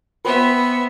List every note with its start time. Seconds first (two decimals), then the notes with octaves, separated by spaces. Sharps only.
0.25 B3 B4 C5 E5 G5